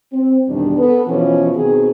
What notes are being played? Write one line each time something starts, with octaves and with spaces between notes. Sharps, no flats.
C4
E2 G2 B2 D#3 G3 D4
B3 A4 B4
B2 E3 F3 B3 C#4
B2 D#3 C4 G#4